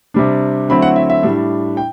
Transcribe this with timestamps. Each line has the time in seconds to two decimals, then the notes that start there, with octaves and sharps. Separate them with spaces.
0.14 C3 G3 D4
0.69 D3 F#3 A3 C4 E4 B5
0.82 F#5
0.96 E5
1.10 E5
1.23 A2 G3 D4
1.77 G5